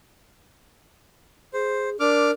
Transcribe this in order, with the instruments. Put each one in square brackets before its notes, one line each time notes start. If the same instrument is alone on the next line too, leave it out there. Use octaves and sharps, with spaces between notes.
[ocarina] G#4 [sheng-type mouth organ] C5
[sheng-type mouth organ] D4 D6 F6 [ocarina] A#4